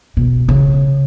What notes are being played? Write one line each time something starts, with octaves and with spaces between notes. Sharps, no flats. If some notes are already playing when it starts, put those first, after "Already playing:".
B2
C#3